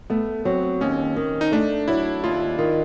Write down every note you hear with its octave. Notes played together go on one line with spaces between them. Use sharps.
A3 B3
F#3 C4
D#2 C#4
D#3
D#4
A3 D4
F#3 E4
D#2 F4
D#3 F4